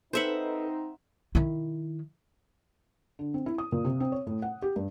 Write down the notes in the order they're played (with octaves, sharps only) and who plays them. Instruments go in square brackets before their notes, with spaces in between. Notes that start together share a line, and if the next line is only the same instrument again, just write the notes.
[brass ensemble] C4 D#4 [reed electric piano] A4 B4 [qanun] C5 E5 F#5
[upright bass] D#3 E4
[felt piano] D3
C4
E4
D#6
A#2
C3
C4
C#5
A2
F#5
G4
G2